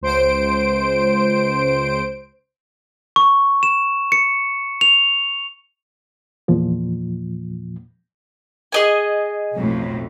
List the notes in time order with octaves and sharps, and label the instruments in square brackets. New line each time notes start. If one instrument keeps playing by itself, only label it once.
[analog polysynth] C#2 C5 D7
[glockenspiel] C#6
E7
C#7
F7
[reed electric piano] E2 A#2 F3
[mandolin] G#4 D#5 G#5
[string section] B1 F2 A2